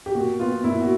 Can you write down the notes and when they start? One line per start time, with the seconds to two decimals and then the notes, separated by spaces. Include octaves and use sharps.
0.06 G4
0.15 A#2 F#4
0.40 B3 F4
0.64 A#2 E4
0.82 F#4